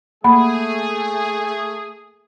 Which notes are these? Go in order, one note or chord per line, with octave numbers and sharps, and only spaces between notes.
A3 A#3 G#4 B5